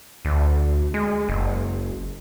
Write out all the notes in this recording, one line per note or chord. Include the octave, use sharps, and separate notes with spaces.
D2
G#3
F#1